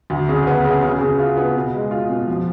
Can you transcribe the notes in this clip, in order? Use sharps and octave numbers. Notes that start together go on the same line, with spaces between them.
D2
C#3
B3
C#3
C#3
C#3
F4
B3
B2
G#3
F4
B2
F3